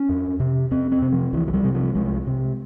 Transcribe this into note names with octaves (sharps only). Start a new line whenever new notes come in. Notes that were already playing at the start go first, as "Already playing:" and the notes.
Already playing: C#4
F2
C3
F2 C4
C4
C3
F3
C2 E3
F3
G3
C3
F3
C2 G#3
C3